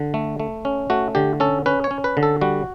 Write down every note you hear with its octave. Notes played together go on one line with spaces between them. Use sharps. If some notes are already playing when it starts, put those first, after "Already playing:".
Already playing: D3
A3
A3
C#4
A3 F#4
D3 G4
C#4 A4
C#4 B4
C#5
C#4
B4
D3
A4
G3 F#4